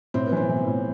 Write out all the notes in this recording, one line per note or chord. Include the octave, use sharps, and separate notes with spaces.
A2 C4
B3
E3 C4
E3
A2